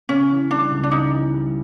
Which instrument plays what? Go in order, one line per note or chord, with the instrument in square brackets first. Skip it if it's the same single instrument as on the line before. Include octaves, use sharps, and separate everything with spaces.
[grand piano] C#3 [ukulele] C#4
[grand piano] E3
[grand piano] G3 [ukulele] D4
[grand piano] C#2
[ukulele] D4
[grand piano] C#3 [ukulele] D#4
[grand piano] E3
G3